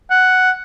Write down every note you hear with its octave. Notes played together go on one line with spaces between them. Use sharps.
F#5